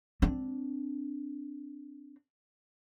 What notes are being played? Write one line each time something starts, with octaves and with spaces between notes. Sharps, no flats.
C4 D4